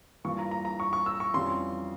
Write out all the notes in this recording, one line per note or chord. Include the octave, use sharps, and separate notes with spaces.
G2 E3 A#3 F4 C#6
A#5
A#5
A#5
C#6
C#6
E6
C#6
F2 E3 G3 C#4 F4 C6